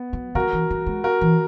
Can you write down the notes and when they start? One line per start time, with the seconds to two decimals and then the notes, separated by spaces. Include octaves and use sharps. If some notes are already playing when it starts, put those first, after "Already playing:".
Already playing: B3
0.13 F#3
0.35 F#3 F#4 A#4
0.53 E3
0.70 F#3
0.86 G#3
1.04 F#4 A#4
1.21 E3